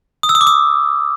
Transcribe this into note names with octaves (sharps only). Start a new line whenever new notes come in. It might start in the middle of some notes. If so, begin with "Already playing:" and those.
D#6
E6
D#6
D6
D#6